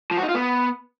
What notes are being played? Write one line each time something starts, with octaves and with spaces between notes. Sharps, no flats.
F3
F#4
D#4
F4
B3